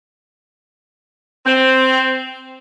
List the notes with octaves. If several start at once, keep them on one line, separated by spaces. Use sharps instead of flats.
C4